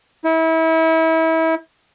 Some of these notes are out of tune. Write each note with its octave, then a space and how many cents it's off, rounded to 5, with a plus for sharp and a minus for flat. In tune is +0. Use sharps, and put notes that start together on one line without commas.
E4 -30